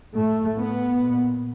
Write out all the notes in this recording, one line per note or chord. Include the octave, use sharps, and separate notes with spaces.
A2 A3
B3
A#2